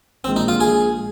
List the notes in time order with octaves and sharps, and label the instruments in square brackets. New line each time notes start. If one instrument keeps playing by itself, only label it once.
[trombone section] A#1 A#2 G#3 [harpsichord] C4
[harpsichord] D#4
F4
G#4